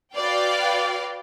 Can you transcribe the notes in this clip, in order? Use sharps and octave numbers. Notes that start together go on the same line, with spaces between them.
F#4 B4 D5 F5 G5